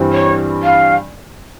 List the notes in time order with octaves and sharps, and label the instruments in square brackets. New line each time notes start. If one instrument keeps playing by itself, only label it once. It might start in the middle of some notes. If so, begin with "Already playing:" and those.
Already playing: [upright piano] G2 E3 G3 C4
[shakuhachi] C#5
F5